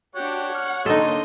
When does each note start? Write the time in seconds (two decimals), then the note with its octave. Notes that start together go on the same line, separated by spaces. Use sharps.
0.16 D4 F#4 G4 C#5 F#5
0.54 F#5 F6
0.86 D3 A#3 D#4 A4 D#5 C6